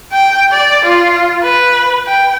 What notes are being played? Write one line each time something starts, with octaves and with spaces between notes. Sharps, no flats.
G5
D5
F4
B4
G5